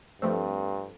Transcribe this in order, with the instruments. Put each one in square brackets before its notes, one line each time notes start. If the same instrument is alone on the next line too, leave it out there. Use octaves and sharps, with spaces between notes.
[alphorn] G2 [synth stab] F3 A3 C4